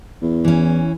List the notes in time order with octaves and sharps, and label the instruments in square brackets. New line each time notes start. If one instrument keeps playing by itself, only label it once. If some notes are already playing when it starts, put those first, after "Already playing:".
[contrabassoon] E2
[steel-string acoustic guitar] E3 C#4